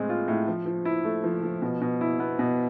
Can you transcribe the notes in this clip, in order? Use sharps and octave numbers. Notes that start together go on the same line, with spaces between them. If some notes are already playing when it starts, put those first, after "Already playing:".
Already playing: A2 G#3 C4
F4
A2
F3
F3
E4
A3
F3
F3
B2
B2
E4
B3
B2